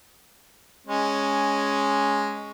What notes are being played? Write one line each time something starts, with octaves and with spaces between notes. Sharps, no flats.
G#3 C#4